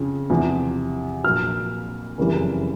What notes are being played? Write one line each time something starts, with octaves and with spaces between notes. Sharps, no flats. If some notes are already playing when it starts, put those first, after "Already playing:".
Already playing: F2 C#3
E2 C3 F3
A#1 A#2 F#3 F6
F#1 F2 C#3 E3 G3